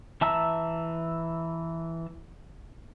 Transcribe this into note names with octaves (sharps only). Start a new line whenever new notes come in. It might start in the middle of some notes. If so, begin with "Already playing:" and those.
E3 E5 A5 A#5 E6